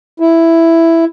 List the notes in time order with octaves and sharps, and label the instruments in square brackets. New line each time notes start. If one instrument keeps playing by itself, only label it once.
[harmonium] E4